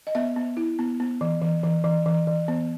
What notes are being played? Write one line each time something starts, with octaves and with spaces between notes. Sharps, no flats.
D#5
B3 E5
B3
E4
B3
B3
E3
E3
E3
E3
E3
E3
B3